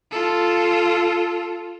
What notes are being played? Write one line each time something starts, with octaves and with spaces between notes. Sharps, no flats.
F4 A4